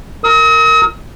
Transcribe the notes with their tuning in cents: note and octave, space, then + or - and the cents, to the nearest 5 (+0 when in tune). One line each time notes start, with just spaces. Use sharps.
A#4 -15 D#6 +45